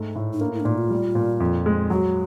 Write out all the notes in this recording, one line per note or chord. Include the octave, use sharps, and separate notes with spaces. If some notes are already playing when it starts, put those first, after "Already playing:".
Already playing: G#2 A3
A2
D#4
A#3 D4
E4
D4
A#2 D#4
F4
G3
A#2
F2
G#3
F#3 F#4